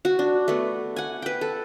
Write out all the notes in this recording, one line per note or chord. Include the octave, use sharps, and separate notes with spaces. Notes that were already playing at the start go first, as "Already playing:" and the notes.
F#4
D4
A3 B3
F#5 G#5
B4 G5
A4